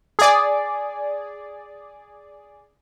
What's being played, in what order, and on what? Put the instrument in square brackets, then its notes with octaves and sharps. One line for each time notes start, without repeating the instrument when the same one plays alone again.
[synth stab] G#4 D5